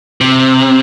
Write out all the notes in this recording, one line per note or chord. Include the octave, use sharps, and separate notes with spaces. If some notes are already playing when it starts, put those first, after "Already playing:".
C3